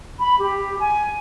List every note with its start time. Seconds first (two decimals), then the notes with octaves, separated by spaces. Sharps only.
0.20 B5
0.39 G4
0.80 G#5